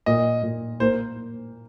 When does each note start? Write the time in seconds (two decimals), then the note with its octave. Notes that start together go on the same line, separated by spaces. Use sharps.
0.06 A#2 D#5
0.43 A#2
0.80 A#3 C5